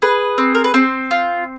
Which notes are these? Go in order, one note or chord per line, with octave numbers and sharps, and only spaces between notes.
G#4 B4
C4
A#4
B4
C4 C5
F4